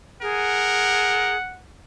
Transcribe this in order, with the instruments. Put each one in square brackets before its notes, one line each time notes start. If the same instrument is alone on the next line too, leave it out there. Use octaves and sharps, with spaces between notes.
[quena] G#4 [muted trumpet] A#4 [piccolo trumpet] F#5